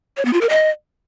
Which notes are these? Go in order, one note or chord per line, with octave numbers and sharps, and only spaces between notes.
C#5
B3
F4
A#4
D#5